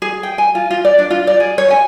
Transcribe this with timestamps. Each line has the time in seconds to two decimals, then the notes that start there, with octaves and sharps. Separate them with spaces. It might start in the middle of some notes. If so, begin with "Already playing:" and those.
0.02 G#4
0.23 G5
0.38 G#5
0.55 F4
0.71 F4
0.85 D5
0.99 D4
1.10 F4
1.27 D5
1.40 G#4
1.58 C#5
1.70 G#5